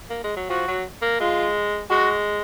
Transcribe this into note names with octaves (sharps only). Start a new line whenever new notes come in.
A#3
G#3
F#3
F3 F#4
F#3
A#3
G#3 F4
G#3 F#4